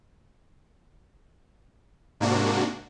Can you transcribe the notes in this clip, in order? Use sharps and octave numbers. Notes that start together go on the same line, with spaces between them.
G#2 C3 A#3 D4 F#4